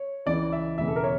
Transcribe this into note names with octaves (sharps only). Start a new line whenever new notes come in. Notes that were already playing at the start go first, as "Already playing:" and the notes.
Already playing: C#5
C#2 C#3 E3 D5
E5
E1 E2 C#3 E5
A4
A#4
C#5